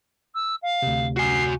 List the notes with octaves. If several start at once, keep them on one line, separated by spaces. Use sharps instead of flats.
E6
F5
D2 C3
F#4 G#5 C7